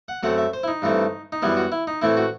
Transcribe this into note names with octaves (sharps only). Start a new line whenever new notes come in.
F#5
F#2 F#3 A3 C4 F#5
E5
C5
E4
D#4
G2 E3 A3 C4
D#4
F#2 E3 G3 B3 E4
F#4
E4
D#4
A2 E3 A3 C4 E4
F#4